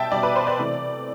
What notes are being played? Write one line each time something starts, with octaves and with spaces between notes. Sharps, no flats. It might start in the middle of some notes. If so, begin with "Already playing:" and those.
Already playing: B2 G3 E5 G5 A5
B2 G3 D5
B4
C5
D5
C3 E3 A3